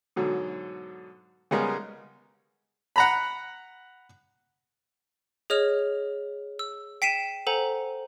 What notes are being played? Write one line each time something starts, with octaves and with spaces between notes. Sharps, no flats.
G#2 B2 D3 F#3
C#3 G3 G#3 B3 A#4
F#5 A#5 B5
G#4 C#5 D#5 F6 F7
E6
G5 B6 C7 D#7 E7
A4 C5 F#5 G#5 A#5